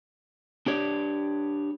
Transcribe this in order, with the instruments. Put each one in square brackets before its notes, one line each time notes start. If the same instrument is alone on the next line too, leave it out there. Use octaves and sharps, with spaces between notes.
[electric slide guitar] D4 G4 C#5 D5